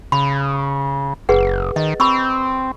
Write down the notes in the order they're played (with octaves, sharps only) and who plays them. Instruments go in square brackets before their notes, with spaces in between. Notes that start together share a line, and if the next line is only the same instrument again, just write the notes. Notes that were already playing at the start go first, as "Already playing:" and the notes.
[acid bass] C#3 [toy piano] B5
[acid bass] F#1 [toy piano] G#4 B4 F#5
[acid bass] D#3 [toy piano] D#5
[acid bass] C4 [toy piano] B5 C#6 E6